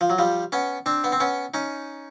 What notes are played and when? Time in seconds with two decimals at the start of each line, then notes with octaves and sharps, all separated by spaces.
0.01 F3
0.10 F#3
0.18 F3 G3
0.52 B3 C#4
0.86 C4 D4
1.04 B3
1.12 C4
1.20 B3 C#4
1.54 C#4 D#4